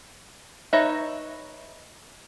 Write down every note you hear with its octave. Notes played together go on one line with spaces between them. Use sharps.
D#4 B4 C#5 E5 A#5